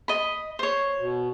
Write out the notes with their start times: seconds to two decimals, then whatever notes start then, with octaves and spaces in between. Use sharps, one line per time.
0.08 D#5 B5
0.59 C5 C#5
0.98 B2